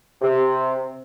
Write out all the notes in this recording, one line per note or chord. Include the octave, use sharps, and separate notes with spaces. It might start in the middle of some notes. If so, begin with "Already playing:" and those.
C3